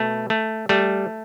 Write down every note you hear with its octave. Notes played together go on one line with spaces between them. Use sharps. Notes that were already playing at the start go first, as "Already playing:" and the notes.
Already playing: B2 A3
A3
G3 A3